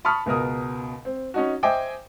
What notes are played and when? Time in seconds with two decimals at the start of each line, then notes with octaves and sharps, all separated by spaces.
0.05 A5 B5 C#6 D#6 F6
0.26 C#2 B2 A#4 D#6
1.05 C4
1.34 C#4 D#4 F#4
1.63 C5 D#5 E5 G5 G#5 D6